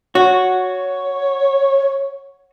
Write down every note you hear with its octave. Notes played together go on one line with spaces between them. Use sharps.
F#4 C#5